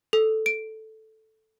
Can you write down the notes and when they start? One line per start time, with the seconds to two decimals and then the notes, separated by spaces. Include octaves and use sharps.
0.13 A4
0.46 D7